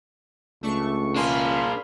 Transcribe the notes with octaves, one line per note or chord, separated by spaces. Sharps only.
C#2 A3 D4 C#6
A#3 D4 G#4 B5 C6 F6